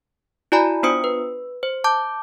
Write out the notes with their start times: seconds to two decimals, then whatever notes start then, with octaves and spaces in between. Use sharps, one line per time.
0.52 E4 F#4 D5 G#5 A#5 B5
0.83 B3 D4 F4 C5 D#6 C#7
1.04 B4
1.63 C5
1.84 A5 D6 G6